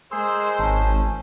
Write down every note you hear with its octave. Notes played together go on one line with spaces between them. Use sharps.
G#3 G#4 A#4 C5 C6 E6
G#1 C#4 A5